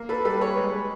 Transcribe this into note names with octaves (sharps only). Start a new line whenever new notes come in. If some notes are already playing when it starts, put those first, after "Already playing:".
Already playing: A#3
A4 B4
G3 A4 B4
B4 C#5
G#3